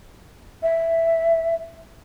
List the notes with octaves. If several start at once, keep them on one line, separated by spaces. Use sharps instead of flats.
E5